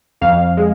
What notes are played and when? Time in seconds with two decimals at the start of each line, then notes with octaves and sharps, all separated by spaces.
0.21 F2 F5
0.57 G#3